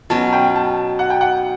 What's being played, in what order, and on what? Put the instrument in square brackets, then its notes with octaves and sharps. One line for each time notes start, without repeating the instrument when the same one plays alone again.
[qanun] B2 F#3 C#4 [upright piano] A5
[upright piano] G5
A5
F#5
G5
F#5